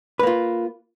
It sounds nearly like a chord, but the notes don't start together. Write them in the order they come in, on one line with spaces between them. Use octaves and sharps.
B4 A#3 F4